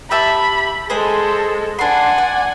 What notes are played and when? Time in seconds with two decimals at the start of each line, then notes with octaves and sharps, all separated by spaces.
0.11 G4 E5 A5 B5
0.90 G#3 G#4 A4 C5
1.79 D4 F#5 G#5 C6
2.18 D5